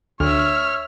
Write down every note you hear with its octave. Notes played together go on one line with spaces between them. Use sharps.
D2 C#5 E5 F6